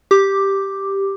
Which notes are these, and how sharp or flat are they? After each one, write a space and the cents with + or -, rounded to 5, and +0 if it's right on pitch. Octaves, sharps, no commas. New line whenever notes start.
G4 +0 D6 +5